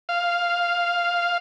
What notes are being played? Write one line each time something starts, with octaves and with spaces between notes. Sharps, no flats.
F5